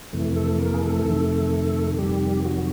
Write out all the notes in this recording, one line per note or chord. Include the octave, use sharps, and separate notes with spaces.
F2 C3 E3 A3
A3 A4
A#3 A#4
G#4
A3 A4
F2 C3 D#3
F2 C3 D#3 G3 G4
F#3 F#4